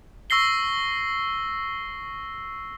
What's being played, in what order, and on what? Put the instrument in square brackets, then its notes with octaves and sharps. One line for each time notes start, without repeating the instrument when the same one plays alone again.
[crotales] C#6 E6 A#6 C7 G7